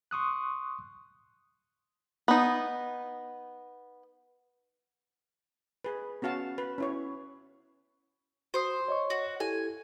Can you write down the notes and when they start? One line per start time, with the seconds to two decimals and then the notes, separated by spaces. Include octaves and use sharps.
0.11 C6 C#6 D#6 F#6
2.28 B3 D#4
5.84 G#4 B4
6.22 B3 C#4 F#4 F5 A5
6.58 B4
6.78 C#4 E4 C#5
8.54 F#4 C5 C6 D#6
8.88 C#5 D#5 C#6
9.10 F#4
9.40 E4 G4 A4 G#5